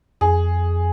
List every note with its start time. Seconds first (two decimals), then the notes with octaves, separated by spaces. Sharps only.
0.21 F2 G#4